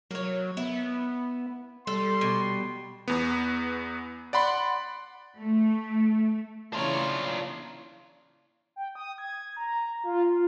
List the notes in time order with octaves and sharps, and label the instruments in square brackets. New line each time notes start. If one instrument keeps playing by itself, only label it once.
[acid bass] F#3 [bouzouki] A#3 C#5
[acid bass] B3 [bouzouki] E4
[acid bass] G3 [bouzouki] A4 [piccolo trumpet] C6
[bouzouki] B2
[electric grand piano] E2 B3
D5 F#5 B5 C6
[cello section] A3
[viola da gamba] C#3 E3 C#5 [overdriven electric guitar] D4 F4
[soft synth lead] G5
D#6
G#6
A#5
F4
F4